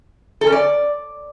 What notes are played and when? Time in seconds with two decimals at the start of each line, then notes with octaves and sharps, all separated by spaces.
0.41 A4
0.47 C#4
0.52 D5